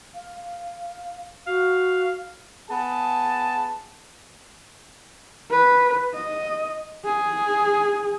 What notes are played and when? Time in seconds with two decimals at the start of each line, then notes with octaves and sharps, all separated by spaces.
0.15 F5
1.47 F#4 F5
2.70 B3 G#4 A5
5.50 B4
6.14 D#5
7.05 G#4